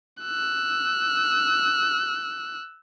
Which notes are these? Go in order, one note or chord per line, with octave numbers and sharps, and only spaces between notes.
E6 F#6